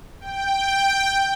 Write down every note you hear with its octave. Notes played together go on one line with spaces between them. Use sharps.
G5